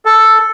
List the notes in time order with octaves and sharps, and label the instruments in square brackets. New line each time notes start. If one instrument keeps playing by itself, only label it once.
[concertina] A4